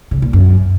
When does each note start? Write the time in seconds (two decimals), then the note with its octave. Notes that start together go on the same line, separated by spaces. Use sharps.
0.11 C#3
0.22 A#2
0.33 F#2